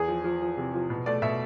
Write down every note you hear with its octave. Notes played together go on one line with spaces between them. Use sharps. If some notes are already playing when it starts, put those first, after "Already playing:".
Already playing: E2 G#4
F3
F3
F3
C3
F3
B2
A3 D5
B2 E5